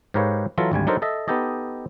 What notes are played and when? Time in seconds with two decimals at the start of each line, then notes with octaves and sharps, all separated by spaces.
0.14 G#2 G4 A#4 B4 C#5 F5
0.58 E3 F#3 F4 A4 A#5
0.72 G#1 D2 G3 G#5
0.87 F#3 D4 D#4 A4 A#4 C5
1.02 A4 D#5 E5
1.28 B3 D#4 G4 A4 D#5